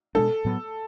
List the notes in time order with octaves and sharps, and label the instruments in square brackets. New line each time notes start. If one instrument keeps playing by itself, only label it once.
[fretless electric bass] B2 G#3 D4 [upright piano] A4
[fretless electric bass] A2 F#3 B3